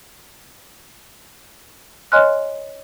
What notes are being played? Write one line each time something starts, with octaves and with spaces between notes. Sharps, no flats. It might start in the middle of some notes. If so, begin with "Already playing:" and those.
C#5 D#5 G#5 C6 F6 F#6